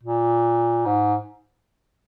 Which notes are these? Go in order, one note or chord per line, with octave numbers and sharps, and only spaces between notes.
A#2
G#2